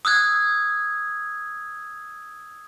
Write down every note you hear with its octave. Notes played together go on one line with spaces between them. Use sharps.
D#6 E6 F#6 G#6